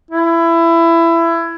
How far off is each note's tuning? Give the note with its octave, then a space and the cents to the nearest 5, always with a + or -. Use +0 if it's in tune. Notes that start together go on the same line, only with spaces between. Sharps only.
E4 +20